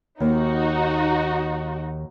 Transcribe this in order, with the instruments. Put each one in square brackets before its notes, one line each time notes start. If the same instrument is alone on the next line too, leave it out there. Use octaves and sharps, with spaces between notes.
[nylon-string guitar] D#2 [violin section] D#4 F#4